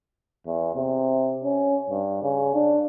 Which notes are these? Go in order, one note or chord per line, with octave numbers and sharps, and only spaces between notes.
E2
C3
C#4
G2
C#3
D4